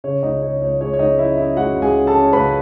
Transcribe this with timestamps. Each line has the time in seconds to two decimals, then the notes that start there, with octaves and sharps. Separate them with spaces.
0.04 C#3 C#5
0.23 C#2 D#4 D#5
0.42 C#3 C#5
0.61 C#2 C#5
0.81 G#3 C#5
0.93 C#5
0.99 C#2 D#4 D#5
1.18 C#4 E4 E5
1.37 C#4 E4 E5
1.56 G#3 F#4 F#5
1.75 C#2
1.82 G#4 G#5
1.95 C#4
2.07 A4 A5
2.13 C#4
2.33 C#2 B4 B5